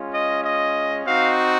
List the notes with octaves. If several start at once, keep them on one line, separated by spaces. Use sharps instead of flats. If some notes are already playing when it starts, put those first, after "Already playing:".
Already playing: G#3 C#4 F4
D#5
D#5
C4 D#4 F#4 F5